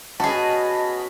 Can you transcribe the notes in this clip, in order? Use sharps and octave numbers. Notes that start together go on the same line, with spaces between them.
B3 C#4 F#4 G#4 D#5 A5 B5